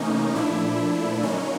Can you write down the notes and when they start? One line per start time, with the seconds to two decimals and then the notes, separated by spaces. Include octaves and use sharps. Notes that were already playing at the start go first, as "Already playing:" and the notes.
Already playing: C3 E3 A3 A#3 C#4 D#4
0.35 A#2 F3 A3 D4 E4
1.22 D3 F#3 A#3 C#4 D#4